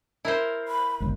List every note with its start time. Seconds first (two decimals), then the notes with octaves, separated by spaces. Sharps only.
0.25 E4 A#4 C5
0.68 B5
1.00 G1 C#2